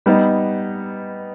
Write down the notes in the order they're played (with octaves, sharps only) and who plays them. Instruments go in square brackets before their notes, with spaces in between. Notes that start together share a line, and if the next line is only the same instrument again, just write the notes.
[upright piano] G3 B3 D#4